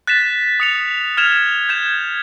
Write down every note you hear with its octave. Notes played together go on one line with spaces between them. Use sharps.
F#6 A6 B6 E7
D#6 C#7 F7
F6 G#6 E7 F7
G6 G#6 E7